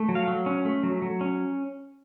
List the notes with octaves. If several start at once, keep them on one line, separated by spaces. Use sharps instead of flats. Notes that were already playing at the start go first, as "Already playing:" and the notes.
Already playing: A3
F#3
F5
F#3
C#4
A3
F#3
F#3
C#4